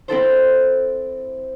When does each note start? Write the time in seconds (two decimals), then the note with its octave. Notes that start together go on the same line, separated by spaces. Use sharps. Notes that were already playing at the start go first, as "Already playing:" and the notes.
0.08 C4 E4 A4 C5